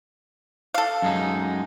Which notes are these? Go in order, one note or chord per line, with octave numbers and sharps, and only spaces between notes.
A4 F5
F#2 G#3 D#4